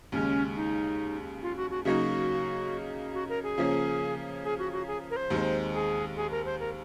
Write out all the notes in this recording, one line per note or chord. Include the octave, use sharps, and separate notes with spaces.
D#2 C#3 G#3 C#4
D#4
F4
F#4
F#4
C#3 F#3 A#3 D#4 F#4
F#4
A#4
G#4
C#3 F3 A#3 C#4
G#4
F#4
F#4
G#4
A#4
C5
D#2 D#3 G#3 C4
G#4
G#4
A#4
C5
A#4